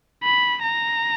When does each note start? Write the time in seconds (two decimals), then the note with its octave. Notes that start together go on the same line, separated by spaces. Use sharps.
0.23 B5
0.64 A#5